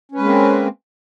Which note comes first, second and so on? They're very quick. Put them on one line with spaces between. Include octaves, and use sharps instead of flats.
C#4 B4 G#3 A#3 C4